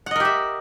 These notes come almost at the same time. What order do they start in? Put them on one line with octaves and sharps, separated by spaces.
F#5 D#5 A#4 G4 E5